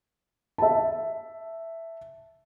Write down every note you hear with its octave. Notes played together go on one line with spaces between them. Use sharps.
E5 A5